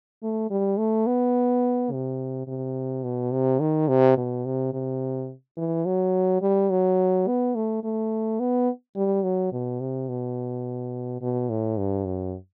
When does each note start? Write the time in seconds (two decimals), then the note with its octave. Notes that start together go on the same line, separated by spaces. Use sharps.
0.23 A3
0.51 G3
0.79 A3
1.07 B3
1.92 C3
2.47 C3
3.04 B2
3.32 C3
3.60 D#3
3.89 C3
4.17 B2
4.45 C3
4.73 C3
5.57 E3
5.85 F#3
6.42 G3
6.70 F#3
7.27 B3
7.55 A3
7.84 A3
8.40 B3
8.96 G3
9.23 F#3
9.52 B2
9.80 C3
10.09 B2
11.21 B2
11.50 A2
11.78 G2
12.05 F#2